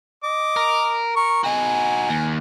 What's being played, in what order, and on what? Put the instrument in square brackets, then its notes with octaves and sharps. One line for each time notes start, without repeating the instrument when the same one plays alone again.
[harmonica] D#5 D6
[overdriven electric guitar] A#4
[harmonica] A#4 C#6
[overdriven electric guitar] D#4 F#4 [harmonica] G#5
[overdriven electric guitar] D#2